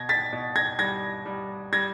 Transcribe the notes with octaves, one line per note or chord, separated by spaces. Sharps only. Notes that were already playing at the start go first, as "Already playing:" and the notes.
Already playing: B2 G#6 A#6
A6 B6
B2
G#6 A#6
G3 G#6 A#6
G3
G3 G#6 A#6